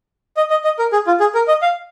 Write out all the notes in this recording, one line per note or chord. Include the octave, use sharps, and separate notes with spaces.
D#5
D#5
D#5
A#4
G#4
F4
G#4
A#4
D#5
F5